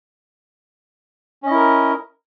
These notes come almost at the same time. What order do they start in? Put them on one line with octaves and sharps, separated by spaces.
C#4 D#5 E4 A#4